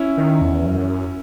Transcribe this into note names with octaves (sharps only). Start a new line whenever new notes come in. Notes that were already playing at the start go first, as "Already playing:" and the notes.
Already playing: C#4 E4
D#3
E2
F#2